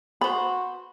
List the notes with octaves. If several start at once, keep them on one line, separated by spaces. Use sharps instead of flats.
B3 F#4 C5 B5